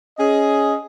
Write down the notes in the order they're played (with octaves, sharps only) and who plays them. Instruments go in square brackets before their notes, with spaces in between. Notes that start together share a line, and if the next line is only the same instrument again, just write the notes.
[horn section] C#4 G#4 D#5